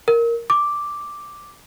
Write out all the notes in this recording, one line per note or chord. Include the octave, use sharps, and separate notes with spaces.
A#4
D6